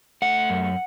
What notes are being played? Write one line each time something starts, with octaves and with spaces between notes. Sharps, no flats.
A3 F#5
F#2